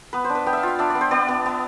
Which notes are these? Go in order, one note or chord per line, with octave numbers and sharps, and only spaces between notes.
B3 B4
C5
D4
B4
B3 G5
E5 F5
F4 F5
D4 E5
D5
B3
C5
B3 D5
B3
B3